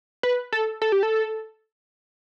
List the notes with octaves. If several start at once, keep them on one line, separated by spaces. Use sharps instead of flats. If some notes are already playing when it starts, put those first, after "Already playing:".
B4
A4
A4
G4
A4